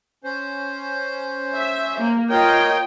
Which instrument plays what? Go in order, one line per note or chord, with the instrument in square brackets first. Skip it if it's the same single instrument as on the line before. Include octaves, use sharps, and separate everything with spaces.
[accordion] C#4 C5
[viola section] E5
A#3
[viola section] F4 D#5 G5 [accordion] A#4 C#5